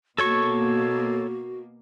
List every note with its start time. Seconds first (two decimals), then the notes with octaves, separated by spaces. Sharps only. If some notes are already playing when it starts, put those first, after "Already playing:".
0.18 B2 A#3 F#4 A4 C#5 C#6